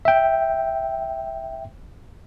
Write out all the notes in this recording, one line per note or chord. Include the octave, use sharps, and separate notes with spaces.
E5 G5